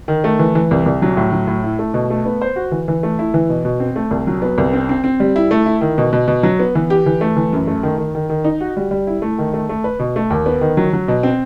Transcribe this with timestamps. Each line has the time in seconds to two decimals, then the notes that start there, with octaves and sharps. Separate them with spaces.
0.08 D#3
0.24 A3
0.39 E3
0.55 E3
0.71 C2
0.86 C2
1.02 F#3
1.17 A2
1.32 F#3
1.47 A2
1.64 E4
1.79 A3
1.94 B2
2.10 A3
2.25 B3
2.41 C5
2.56 F#4
2.72 E3
2.88 E3
3.03 A3
3.19 E4
3.34 E3
3.49 B2
3.65 B2
3.80 C4
3.96 A3
4.11 C2
4.27 F#3
4.42 B3
4.58 C2
4.73 C4
4.89 C4
5.04 C4
5.20 G3
5.36 E4
5.51 A3
5.66 E4
5.81 D#3
5.98 B2
6.13 B2
6.28 B2
6.43 F#3
6.59 B3
6.75 E3
6.90 G4
7.06 E3
7.21 A3
7.36 E3
7.53 F#2
7.67 A3
7.83 D#3
7.98 D#3
8.15 D#3
8.29 D#3
8.44 D#4
8.61 F#4
8.77 G3
8.91 G3
9.07 E4
9.22 A3
9.38 D#3
9.54 A3
9.69 A3
9.84 B4
9.99 B2
10.16 A3
10.30 D#2
10.46 B3
10.61 D#3
10.77 F#3
10.93 F#3
11.08 B2
11.23 C4